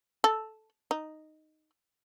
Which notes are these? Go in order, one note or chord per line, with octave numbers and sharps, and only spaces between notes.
A4
D#4